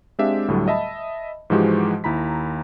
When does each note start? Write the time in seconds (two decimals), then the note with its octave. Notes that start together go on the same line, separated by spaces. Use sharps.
0.19 G#3 C4 D4 G4 E5 F5
0.48 D2 A2 D3 F#3 G3 A3
0.68 D#5 E5 A5 B5
1.50 G#2 E3 F3 G#3 F#4 G4
2.04 D#2 E4 A#5 B5 B6